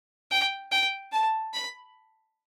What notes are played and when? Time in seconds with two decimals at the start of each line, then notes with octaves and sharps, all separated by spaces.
0.31 G5
0.72 G5
1.12 A5
1.53 B5